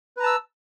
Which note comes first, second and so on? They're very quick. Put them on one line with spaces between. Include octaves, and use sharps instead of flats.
B4 A#5 A5 E6